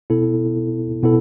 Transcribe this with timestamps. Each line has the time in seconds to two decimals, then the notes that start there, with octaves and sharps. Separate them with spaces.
0.10 B2 B3 E4 A4
1.03 B2 B3 E4 A4